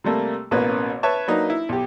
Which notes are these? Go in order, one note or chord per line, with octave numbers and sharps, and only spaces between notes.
C3 G3 A3 A#3
A1 B2 A#3 C#4 B4
B4 C#5 E5 A5 C#6
F#3 A#3 D4 D#4 B4
E4
B1 G4